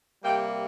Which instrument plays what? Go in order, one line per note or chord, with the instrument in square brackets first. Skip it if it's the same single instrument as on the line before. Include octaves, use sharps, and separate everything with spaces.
[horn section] C3 G3 A#3 G5